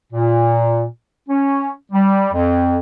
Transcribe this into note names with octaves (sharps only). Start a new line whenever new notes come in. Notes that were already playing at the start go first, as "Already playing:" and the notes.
A#2
C#4
G3
F2